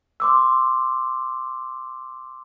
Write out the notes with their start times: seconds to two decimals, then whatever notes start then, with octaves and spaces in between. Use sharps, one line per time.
0.20 C6 D6 E6